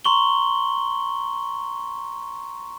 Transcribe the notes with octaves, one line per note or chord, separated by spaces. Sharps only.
A#5 C6 C#6 F#7 G7